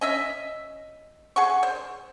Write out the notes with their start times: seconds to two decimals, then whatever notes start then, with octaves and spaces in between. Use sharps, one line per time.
0.01 C#4 D#5 E5
1.36 G#4 F#5 C#6
1.63 C5